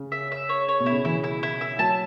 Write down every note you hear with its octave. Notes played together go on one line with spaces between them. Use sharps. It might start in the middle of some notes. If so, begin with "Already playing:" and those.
Already playing: C#3
E5
E5
C#5
C#5
B2
E4
C#3
E3 E4
E4
E4
E5
F#3 A5